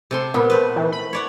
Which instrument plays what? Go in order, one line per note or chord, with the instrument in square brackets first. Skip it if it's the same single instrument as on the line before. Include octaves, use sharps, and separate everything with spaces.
[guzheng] C3 A4 C6
[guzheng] A#2 [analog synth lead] B3
[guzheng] A3 C4 B4
[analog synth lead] E3
B5
[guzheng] C#5 D5 F#5